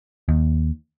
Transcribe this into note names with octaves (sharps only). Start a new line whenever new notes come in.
D#2